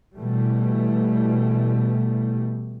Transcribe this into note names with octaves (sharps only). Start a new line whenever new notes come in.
B2 E3 G3 A3